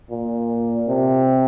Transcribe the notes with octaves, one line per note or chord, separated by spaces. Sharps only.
A#2
C3